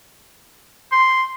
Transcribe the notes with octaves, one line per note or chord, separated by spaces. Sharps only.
C6